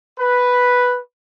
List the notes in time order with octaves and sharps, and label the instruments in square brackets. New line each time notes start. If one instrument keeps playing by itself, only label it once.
[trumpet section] B4